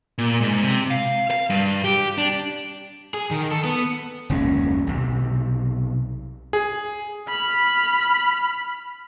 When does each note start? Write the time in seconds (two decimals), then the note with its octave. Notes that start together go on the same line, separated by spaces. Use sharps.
0.18 A#2
0.41 G#2
0.63 C3
0.91 F5
1.31 F5
1.50 G2
1.84 G4
2.18 D4
3.14 G#4
3.31 D#3
3.51 A4
3.65 B3
4.30 F#1 D#2 G#3 C#4
4.87 B1 C3
6.53 G#4
7.28 B5 F6